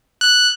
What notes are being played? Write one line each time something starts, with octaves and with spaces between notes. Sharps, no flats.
F#6